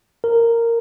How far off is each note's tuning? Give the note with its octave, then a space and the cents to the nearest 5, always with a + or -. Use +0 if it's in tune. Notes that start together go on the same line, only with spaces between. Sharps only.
A#4 -10